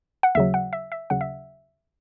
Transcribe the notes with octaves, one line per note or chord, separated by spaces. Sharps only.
F#5
D#2 C#3 F#3 E5
F#5
E5
E5
D#2 C#3 F#3 F#5
E5